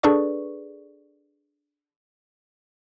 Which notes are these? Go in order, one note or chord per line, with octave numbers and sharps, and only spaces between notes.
D4 G#4 A4 B4 D5 C#6